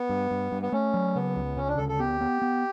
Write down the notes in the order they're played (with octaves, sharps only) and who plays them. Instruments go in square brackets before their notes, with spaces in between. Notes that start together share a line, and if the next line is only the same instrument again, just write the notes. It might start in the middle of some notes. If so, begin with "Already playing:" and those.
Already playing: [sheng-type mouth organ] B3
[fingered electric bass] G2
G2
G2
[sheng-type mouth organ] B3
[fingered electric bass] A3 [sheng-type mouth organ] C#4
[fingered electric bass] F#3
[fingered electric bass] C#3 [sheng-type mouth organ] B3
[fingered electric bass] C#2
[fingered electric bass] C#3 [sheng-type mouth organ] C#4
[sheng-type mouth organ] D4
[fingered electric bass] D2 [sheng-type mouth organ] A4
[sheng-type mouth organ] A4
[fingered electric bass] B3 [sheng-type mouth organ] G4
[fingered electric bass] B3
B3